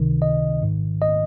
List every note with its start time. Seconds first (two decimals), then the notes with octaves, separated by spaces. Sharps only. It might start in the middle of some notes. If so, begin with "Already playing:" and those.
Already playing: C#2 C3 D#3
0.22 D#5
0.62 G#1 G#2 D#3
1.02 D#5